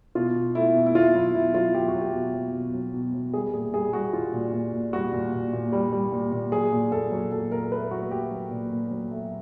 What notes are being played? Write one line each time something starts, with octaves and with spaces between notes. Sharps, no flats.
B2 F4
B2
A3 E4
B2
E4
B2 F4
F#3 E4
B2 E4
F#3 F4
F#3 G4
F#4
F#3
G4
B2
F#3
B2
F#3
B2
F#3
G3 G#4
A#2 G#4
G3 G#4
G3 F#4
G3 F4
A#2
A#2
A#2
G3 F#4
A#2
A#2
A#2
G3
G3
A#2
A#2
F#3 G#4
A#2
A#2 A4
F#3
A#2 A4
A#2 A#4
A3 B4
F#3 F#4
A3 G4
F#3
A#2
A#2
F#3
A3